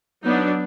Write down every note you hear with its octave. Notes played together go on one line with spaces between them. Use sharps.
F#3 B3 D4 D#4